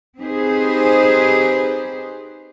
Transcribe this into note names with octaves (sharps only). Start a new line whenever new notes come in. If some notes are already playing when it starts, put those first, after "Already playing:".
C4 D#4 G4 G#4 B4 C5